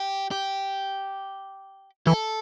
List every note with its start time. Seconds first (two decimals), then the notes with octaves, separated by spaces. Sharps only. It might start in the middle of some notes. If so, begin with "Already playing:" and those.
Already playing: G4
0.31 G4
2.07 E3 A4